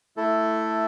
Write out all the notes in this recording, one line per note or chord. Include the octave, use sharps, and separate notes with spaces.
A3 E4 A4